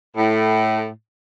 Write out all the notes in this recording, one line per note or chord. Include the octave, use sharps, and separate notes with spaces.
A2